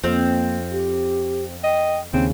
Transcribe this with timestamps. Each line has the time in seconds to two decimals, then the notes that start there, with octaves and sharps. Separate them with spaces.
0.04 F2 A#3 C4 F5
0.72 G4
1.64 D#5 G5
2.14 D#2 C#3 C4 C#4